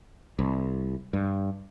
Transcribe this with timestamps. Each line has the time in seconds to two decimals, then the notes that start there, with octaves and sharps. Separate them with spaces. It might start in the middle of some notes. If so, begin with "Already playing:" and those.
0.39 C2
1.13 G2